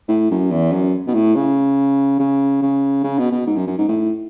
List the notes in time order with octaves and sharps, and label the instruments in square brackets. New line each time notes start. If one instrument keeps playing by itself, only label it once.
[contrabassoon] A2
F#2
E2
F#2
B2
A2
C#3
C#3
C#3
C#3
B2
B2
G#2
F#2
F#2
G#2
A2